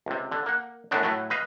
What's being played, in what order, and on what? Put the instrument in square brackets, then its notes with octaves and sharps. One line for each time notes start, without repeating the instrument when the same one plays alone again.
[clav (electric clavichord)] C#2 C3
D3
A#3 F#5
F#2 A2 F#3 G#3 B3 D4
A2 F#3 A3
B4 D#5 F5